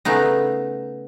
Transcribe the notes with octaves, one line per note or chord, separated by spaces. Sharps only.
C#3 A3 B3 D#4